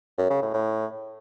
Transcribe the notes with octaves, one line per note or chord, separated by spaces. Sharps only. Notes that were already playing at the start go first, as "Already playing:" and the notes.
F#2
C#3
A2
A2